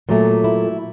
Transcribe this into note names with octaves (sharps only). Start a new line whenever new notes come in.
A#2 F#3 A3
E4